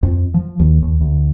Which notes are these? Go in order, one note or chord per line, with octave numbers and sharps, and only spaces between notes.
F2
F3
D#2
D#2
D2